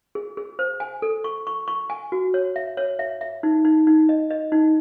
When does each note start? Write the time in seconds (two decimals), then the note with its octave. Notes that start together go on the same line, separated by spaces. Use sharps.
0.15 G#4
0.37 G#4
0.59 C5
0.80 G#5
1.02 A4
1.24 C#6
1.47 C#6
1.68 C#6
1.90 G#5
2.12 F#4
2.34 C#5
2.56 E5
2.77 C#5
2.99 E5
3.21 E5
3.43 D#4
3.65 D#4
3.87 D#4
4.09 D#5
4.31 D#5
4.52 D#4